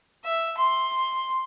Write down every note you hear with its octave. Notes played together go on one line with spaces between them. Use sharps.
E5
C6